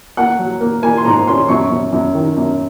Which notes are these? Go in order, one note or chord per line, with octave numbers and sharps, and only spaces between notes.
A#3 F#5
F#3
A#3
A#3 G#5
C6
G#2 A#5
C#4 C6
F#2 C#6
F#2
F#2
D#3
F#2